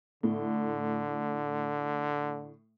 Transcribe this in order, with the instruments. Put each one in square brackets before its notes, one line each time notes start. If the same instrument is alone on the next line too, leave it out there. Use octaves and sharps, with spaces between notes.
[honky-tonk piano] A2 [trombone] D3